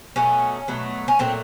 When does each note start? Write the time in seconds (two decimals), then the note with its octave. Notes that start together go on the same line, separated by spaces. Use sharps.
0.16 B2 F#3 A3 C#4
0.68 B2 F#3 A3
1.08 C#4
1.19 A#2 F#3 A3 C4